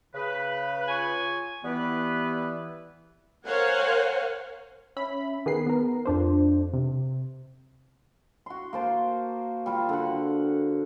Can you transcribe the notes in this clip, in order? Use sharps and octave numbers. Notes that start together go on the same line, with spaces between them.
C#3 B4
F4 C#5 G#5
E3 G3 B3 B4
A#4 C5 C#5 F5 F#5 G#5
C#4 E5 B5
D#3 B3 G#4 B4 C7
B3 A#4
F2 D4 C5
C3
F#4 C6
A#3 C5 A5
G3 F4 F#4
D3 F#5